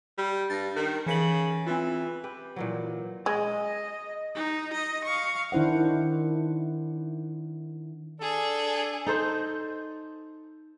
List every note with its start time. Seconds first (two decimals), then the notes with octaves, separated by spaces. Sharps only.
0.18 G3
0.50 G2 A6 A#6
0.76 D#3
1.06 C#3 E3 B6 F#7
1.67 E3 C4 F4
2.24 G4 B4
2.56 A#2 E3 F#3
3.26 G#3 D#5
4.35 D#4
4.73 D#5
5.04 F5 C#6
5.52 D#3 D4 E4 C5 F#5
8.20 D4 G#4 A4
9.06 D#4 A4 C5